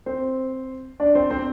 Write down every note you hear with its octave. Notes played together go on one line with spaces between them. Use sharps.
C4 C5
D4 D5
C4 C5
C4 C5